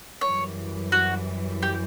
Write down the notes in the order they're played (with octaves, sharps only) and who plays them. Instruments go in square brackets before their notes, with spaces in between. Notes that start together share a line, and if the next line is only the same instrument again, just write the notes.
[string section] F#2 E3 G3 [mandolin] C#5
[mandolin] F#4
G4